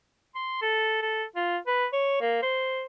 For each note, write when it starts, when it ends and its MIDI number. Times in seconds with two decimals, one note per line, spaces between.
0.35 0.61 84
0.62 1.00 69
1.02 1.24 69
1.36 1.58 65
1.67 1.86 71
1.93 2.16 73
2.21 2.41 58
2.43 2.86 72